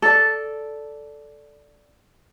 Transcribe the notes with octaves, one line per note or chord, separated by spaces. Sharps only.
A4 D5